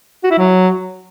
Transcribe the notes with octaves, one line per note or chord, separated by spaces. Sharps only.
F#4
E4
F#3